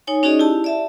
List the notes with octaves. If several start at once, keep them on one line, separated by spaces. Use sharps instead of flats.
D#4 C#5 G#5
C#4 D#4 F#4 G#4 D5 D#5
E4 G4 A5
D5 E5 A5